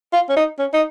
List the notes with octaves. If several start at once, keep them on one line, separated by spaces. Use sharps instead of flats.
F4
C#4
D#4
C#4
D#4